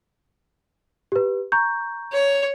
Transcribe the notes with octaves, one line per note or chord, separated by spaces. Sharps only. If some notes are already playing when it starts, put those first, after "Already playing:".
G4 B4
A#5 C#6 G6
C#5